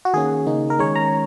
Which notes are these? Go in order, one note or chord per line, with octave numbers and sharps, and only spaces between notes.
F#4
D#3 A#3 C#4 G#4
C#3 A#3 D#4
A#4
D#3 G#3 C#4 C#5
A#5